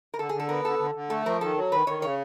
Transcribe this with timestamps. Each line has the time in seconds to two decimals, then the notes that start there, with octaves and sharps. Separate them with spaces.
0.14 A#4
0.19 D3 A4
0.29 G#4
0.34 D3
0.40 A4
0.49 B3 A#4
0.65 D3 A4
0.79 D3
0.95 D3
1.10 A3 A4
1.25 F3 A#4
1.41 D#3 A4
1.56 F#3
1.72 D#3 B4
1.87 D#3 C#5
2.02 C#3 C#5